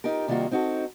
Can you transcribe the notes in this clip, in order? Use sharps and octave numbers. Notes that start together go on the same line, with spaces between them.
D#4 F4 G4 A#4
C3 D#3 G3 A#3 F4 F#4
C4 D#4 F#4 G4 A4